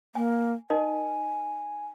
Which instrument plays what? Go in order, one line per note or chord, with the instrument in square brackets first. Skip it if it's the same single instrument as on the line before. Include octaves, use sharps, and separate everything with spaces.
[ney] A#3 [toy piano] G#5
[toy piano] D#4 A#4 D#5 [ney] G#5